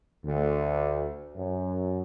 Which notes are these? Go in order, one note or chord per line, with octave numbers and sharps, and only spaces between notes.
D2
F#2